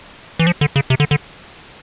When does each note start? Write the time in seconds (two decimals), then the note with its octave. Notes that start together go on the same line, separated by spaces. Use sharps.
0.39 E3
0.47 F3
0.61 D3
0.76 C#3
0.90 C3
1.00 D3
1.11 D3